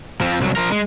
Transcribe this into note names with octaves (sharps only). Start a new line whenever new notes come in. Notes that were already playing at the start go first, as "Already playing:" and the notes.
F3 C4
C2 F#3
F3 A#4
G#3